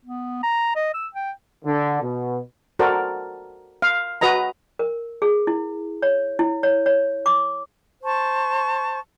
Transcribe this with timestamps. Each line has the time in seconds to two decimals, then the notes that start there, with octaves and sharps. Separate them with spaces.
0.05 B3
0.43 A#5
0.75 D#5
0.94 E6
1.15 G5
1.65 D3
2.01 B2
2.79 F#4 A4 A#4 C5 D5
3.82 F5
4.21 F#4 B4 D#5 A#5
4.79 A#4
5.22 G#4
5.47 E4
6.02 C#5
6.39 E4
6.63 C#5
6.86 C#5
7.26 D6
8.04 C5 A5 C#6